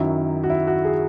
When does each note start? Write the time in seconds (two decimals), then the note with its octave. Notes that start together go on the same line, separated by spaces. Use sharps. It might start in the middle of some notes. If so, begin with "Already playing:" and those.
Already playing: F#2 D#3 F#3 E4
0.44 F#4
0.50 E4
0.67 F#4
0.85 G#4